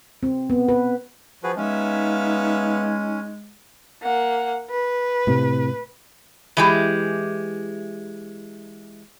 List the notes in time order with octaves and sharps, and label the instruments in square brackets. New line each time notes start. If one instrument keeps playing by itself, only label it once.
[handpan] C4
B3
B4
[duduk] F3 [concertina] F#4 G#4 B4
[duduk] G#3 [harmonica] B3 E5 F5 [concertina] C#4 [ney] D#4
[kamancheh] A#3 F#5
B4
[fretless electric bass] A2 C3
[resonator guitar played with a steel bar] E3 G#3 G4